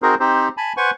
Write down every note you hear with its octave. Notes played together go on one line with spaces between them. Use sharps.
C4 D#4 F#4 G#4 A#4 C5
C4 D#4 G4 C5
G#5 A5 B5
B4 C5 F#5 G#5 C#6